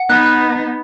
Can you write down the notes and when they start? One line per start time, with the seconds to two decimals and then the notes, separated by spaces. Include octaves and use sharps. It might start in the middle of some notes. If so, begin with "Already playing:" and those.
Already playing: F#5
0.09 B3 D#4 F#6
0.26 F#6